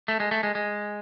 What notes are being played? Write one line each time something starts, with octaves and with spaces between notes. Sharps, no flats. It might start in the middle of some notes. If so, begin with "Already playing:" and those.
A3
G#3
A3
G#3
G#3